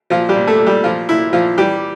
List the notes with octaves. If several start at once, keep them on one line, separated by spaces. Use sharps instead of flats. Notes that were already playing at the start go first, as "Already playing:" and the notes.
A#2 F3 F4
G3 G4
A#2
A3 A4
A#2
G3 G4
A#2 F3 F4
A#2 E4
A#2 F3 F4
E3 G3 G4